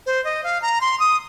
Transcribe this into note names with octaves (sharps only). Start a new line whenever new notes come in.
C5
D#5
F5
A#5
C6
D#6